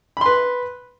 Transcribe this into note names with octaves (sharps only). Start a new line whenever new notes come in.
B4 B5 C6